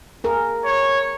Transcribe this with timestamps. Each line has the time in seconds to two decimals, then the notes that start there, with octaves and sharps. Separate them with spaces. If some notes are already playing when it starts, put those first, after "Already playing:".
0.24 G#4 A#4
0.65 C#5